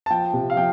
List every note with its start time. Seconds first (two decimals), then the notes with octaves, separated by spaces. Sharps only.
0.06 A5
0.10 F3 G5
0.33 C3
0.50 F5
0.57 F3 G5